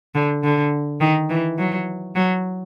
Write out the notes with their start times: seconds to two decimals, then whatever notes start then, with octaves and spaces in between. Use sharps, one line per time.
0.15 D3
0.44 D3
1.01 D#3
1.30 E3
1.58 F#3
2.15 F#3